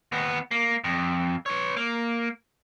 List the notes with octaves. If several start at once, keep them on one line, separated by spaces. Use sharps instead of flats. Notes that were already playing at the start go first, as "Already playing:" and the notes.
D#2 B3
A#3
F2
B4 C#5
A#3